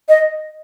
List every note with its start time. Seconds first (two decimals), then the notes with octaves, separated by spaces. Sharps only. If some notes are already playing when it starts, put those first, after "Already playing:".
0.09 D#5